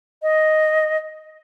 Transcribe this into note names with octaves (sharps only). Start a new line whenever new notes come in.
D#5